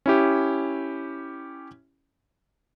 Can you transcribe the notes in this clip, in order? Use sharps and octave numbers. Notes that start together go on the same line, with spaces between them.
C#4 E4 G4